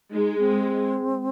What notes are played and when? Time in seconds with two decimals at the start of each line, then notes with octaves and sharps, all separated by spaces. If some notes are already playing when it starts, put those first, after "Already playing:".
0.12 G#3 D#4
0.39 C4